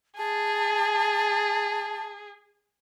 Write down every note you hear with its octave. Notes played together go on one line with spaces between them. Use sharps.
G#4 A5